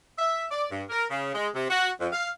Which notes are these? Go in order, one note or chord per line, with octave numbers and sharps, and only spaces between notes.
E5
D5
G2
A#4
C#3
G#3
C3
F#4
F2
F5